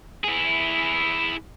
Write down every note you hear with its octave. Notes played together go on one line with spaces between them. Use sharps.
E4 G#4